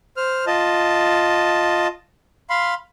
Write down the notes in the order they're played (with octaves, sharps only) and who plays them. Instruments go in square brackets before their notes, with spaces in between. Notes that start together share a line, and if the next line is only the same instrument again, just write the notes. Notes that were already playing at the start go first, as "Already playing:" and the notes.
[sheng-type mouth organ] C5 F6
F4 D#5 A5
F5 B5 C6